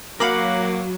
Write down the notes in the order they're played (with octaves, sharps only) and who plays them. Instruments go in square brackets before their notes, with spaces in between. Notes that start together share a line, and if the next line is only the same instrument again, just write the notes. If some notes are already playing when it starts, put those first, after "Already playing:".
[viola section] F#3 [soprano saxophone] A#3 [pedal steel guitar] A#4 F#5 [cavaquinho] F5 B5 D6